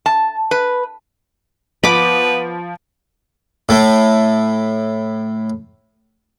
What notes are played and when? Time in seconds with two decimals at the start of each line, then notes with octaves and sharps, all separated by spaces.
0.06 A5
0.51 B4
1.84 F3 B3 B4 B5 D6
3.69 A2 A3